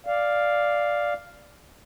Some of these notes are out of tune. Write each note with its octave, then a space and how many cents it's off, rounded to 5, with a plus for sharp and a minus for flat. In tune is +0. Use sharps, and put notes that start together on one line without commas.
D5 +0 F5 +0